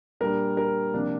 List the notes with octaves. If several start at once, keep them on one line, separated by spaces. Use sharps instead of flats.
A#2 G3 D4 A#4
A#4
C3 F3 A#3 D4